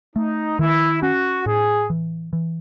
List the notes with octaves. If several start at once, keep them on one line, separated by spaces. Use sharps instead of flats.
A3 D#4
D#3 E4
C#4 F#4
A2 G#4
E3
E3